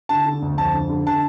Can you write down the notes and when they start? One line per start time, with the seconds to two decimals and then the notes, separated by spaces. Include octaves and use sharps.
0.09 D3 A5
0.26 D3
0.42 D2
0.58 F2 A5
0.74 D3
0.89 D3
1.06 D3 A5